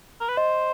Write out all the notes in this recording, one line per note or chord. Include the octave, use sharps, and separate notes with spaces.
A#4
B4
C5 D#5